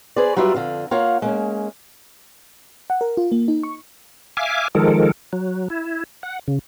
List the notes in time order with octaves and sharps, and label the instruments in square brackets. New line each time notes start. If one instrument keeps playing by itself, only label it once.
[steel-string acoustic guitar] G#4 B4 C5 D5
F#3 G3 D4 F4 B4 E5
F2 D3 F3 F5
A#3 F4 A#4 C#5 F5 F#5
G#3 A#3 C#4
[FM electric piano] F#5
A#4
F4
A#3
D#4
C#6
[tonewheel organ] E5 F5 G#5 D6
D#3 F3 G#3 A4 A#4
F#3
E4
F#5
C#3